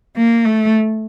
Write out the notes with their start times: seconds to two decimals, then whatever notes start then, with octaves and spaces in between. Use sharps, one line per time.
0.16 A#3
0.45 A3